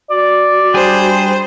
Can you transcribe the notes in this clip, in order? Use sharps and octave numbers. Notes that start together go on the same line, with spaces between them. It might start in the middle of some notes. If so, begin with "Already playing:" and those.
F#4 D5
G3 D4 G#4 C5